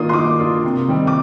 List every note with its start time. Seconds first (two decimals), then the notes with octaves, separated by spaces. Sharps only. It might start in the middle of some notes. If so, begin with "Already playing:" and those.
Already playing: D#3 A#3 D4 F4 D#6
0.09 C6
0.13 D#3 D6
0.38 A#3 D4 F4
0.64 C3
0.88 D#3 G3 C4
1.07 D6